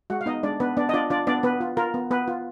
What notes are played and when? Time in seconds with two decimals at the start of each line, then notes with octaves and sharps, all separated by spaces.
0.10 G#3 F#4 F#5
0.21 F5
0.26 B3 D#4 D#5
0.43 G#3 D4 D5
0.60 B3 D4 B4
0.77 B3 D4 D5
0.89 D#5
0.93 D4 F4 D5
1.10 D4 F4 D5
1.27 B3 D4 D5
1.43 B3 B4
1.61 F4
1.77 F4 A#4
1.94 B3
2.11 B3 B4
2.28 F4